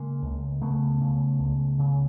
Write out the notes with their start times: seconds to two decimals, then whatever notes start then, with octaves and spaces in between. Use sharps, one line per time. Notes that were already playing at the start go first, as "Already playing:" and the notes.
Already playing: C#3 G#3 A#3
0.22 C#2
0.61 C#3 A3 B3
1.01 C#3
1.39 C#2
1.79 C#3